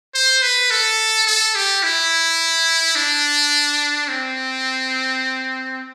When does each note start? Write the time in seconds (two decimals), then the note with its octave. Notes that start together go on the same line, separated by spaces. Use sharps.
0.14 C5
0.42 B4
0.71 A4
1.27 A4
1.55 G4
1.83 E4
2.95 D4
4.09 C4